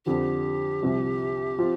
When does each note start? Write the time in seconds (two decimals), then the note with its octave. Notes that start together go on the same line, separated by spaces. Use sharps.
0.06 F2 D3 F3 G4
0.82 C2 C3 F3
1.59 F3 C4 F4